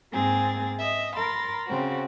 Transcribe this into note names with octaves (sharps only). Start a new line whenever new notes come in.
G#2 A#3 C4 G#4 A6
D#5 E5
A#4 B5 C6 A6
C#3 C4 F#4